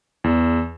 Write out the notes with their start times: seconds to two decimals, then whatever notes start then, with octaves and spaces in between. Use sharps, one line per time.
0.24 E2